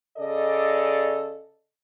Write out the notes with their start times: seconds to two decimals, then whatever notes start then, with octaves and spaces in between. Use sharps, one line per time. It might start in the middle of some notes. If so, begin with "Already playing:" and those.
0.17 C#3 A4 D5 D#5